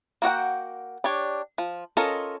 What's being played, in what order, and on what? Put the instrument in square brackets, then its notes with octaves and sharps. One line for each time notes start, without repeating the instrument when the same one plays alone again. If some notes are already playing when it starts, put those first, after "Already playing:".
[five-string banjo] A#3 F#4 F#5 G5
D4 G4 C#5
F3
C#4 F4 A4 A#4 D#5